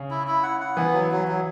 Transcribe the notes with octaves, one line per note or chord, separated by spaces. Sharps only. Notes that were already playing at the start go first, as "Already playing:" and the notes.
Already playing: C#3
E4
E4
F#5
F#5
E3 B3
F#3
F#3
F#3